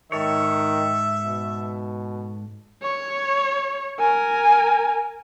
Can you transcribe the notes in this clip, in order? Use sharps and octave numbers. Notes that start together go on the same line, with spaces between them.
G#2 D#3 A4 C#5 E5
B2
C#5
A#4 G#5